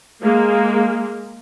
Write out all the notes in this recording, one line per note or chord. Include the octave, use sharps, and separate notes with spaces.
G#3 A#3